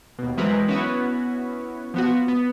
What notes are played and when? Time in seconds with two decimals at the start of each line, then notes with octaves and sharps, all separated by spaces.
0.18 D#2 B2
0.37 E3 F#3 G#3 C4 A#4 B4
0.68 B3 C#4 E4 F#4 B4 C#5
1.94 F3 B3 F#4
2.28 B3